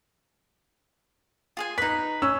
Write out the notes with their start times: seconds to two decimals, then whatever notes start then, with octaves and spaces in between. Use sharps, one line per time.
1.57 F4 G#4 G#5
1.78 D#4 B4 B6
2.22 C#4 E6